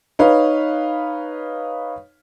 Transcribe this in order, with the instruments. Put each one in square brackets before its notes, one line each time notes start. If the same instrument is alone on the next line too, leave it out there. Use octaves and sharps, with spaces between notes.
[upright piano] D#4 B4 C#5 F5